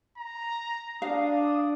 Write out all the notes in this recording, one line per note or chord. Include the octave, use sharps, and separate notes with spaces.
A#5
D4 F5 D#6